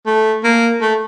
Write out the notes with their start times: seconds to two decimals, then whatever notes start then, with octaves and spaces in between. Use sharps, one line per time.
0.06 A3
0.44 A#3
0.81 A3